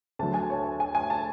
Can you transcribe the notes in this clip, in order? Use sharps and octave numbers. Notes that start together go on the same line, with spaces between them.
D2 D3 F#3 A5
G#5
C#5
C#5
G#5
G#5
A5